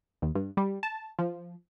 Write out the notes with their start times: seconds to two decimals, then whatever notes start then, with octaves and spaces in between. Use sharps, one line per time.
0.22 D#2
0.35 G2
0.57 G3
0.83 A5
1.19 F3